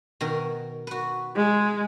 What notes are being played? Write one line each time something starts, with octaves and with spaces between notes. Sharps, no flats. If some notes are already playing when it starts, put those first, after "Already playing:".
B2 D#3 A#4
F#4 B4
G#3